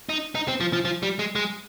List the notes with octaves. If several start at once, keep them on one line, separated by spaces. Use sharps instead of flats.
D#4
D#4
C4
F3
F3
F3
G3
G#3
G#3